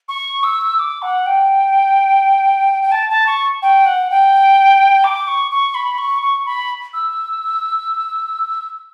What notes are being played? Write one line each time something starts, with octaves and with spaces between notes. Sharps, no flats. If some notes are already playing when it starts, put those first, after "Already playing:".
C#6
E6
D6
F#5
G5
G5
A5
A5
C#6
G5
F#5
G5
D6
C#6
C#6
B5
C#6
C#6
B5
E6